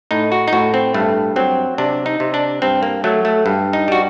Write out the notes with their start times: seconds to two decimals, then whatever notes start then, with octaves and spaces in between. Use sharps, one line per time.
0.11 A2 D#4
0.32 F#4
0.48 D#4
0.53 A2 F#4
0.74 C4
0.94 G2 A3
1.36 F#3 C4
1.78 C3 D4
2.06 D#4
2.20 C3
2.34 D4
2.62 G2 C4
2.83 A#3
3.04 F#3 A3
3.25 A3
3.46 G2
3.73 D#4
3.88 G3 F#4